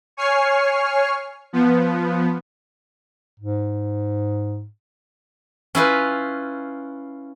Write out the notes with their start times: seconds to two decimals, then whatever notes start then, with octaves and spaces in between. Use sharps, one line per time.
0.17 C#5 G#5 C#6 F6 C7
1.53 F3 B3
3.40 G#2
5.75 C#4 E4 F4 B4